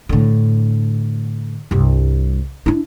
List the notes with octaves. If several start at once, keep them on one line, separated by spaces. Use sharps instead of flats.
A2 D3
C2 G2
D4 E4